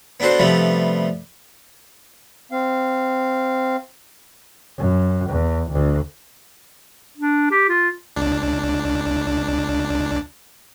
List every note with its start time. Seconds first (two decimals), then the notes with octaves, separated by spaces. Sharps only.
0.20 B3 D4 F#4 A4 C5
0.39 C3 F3 G3 A3 B3
2.52 C4 F5
4.78 F#2
5.30 E2
5.70 D2
7.17 D4
7.51 G4
7.69 F4
8.16 C#2 D4